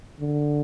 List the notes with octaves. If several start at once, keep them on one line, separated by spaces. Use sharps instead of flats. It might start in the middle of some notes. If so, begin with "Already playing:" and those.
D3